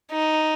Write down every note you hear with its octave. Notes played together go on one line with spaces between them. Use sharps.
D#4